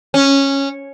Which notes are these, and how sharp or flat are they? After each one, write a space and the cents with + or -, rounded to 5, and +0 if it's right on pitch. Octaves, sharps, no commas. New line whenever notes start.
C#4 -10